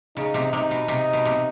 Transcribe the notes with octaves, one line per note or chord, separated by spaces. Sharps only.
C#3 D#4
C3
C3 D#4
B2
C3
B2
C3